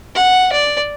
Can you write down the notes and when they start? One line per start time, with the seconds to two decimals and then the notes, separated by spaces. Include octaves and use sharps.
0.15 F#5
0.52 D5